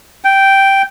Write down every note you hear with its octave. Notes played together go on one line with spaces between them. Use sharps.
G5